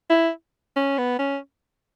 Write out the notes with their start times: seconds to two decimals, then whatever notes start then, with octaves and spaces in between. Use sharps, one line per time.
0.10 E4
0.76 C#4
0.98 B3
1.19 C#4